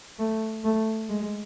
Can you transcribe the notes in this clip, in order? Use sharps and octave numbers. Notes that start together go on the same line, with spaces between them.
A3
A3
G#3